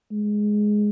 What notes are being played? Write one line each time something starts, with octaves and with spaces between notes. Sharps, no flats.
G#3